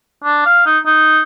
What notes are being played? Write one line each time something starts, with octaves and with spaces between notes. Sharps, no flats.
D4
F5
D#4
D#4